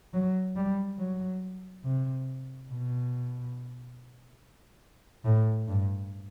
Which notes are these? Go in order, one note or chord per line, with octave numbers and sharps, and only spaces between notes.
F#3
G3
F#3
C3
B2
A2
G2